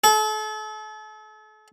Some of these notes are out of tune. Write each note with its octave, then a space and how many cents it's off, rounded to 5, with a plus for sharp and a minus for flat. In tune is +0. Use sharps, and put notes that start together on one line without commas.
A4 -40